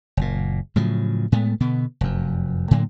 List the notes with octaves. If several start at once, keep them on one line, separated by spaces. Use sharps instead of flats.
F#1 A#2
A2 C#3 F3 F#3
A2 G#3 A3 B3
B2 D3 B3
F1 F#2
A2 D3 F#3 A#3